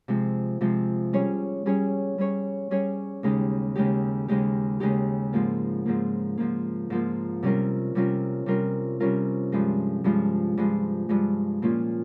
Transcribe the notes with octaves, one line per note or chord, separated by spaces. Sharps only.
C3 F3 G#3
C3 F3 G#3
G3 C#4 G#4 C#5
G3 C#4 G#4 C#5
G3 C#4 G#4 C#5
G3 C#4 G#4 C#5
D#2 C#3 G#3 D#4 G4
D#2 C#3 G#3 D#4 G4
D#2 C#3 G#3 D#4 G4
D#2 C#3 G#3 D#4 G4
G#2 F3 A#3
G#2 F3 A#3
G#2 F3 A#3
G#2 F3 A#3
C3 G3 C#4 F4 A#4
C3 G3 C#4 F4 A#4
C3 G3 C#4 F4 A#4
C3 G3 C#4 F4 A#4
G2 F3 G#3
G2 F3 G#3
G2 F3 G#3
G2 F3 G#3
A#2 F3 A#3 C#4 F4